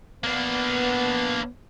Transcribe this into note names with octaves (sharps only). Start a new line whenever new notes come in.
A#3 B3 D4